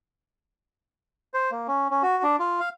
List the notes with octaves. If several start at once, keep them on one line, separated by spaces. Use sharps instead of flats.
C5
A#3
C#4
C#4
F#4
D4
F4
F5